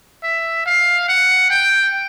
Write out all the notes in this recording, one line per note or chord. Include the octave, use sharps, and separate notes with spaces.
E5
F5
F#5
G5